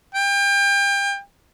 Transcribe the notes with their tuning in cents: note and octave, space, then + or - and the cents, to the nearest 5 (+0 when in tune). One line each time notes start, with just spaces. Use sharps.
G5 +30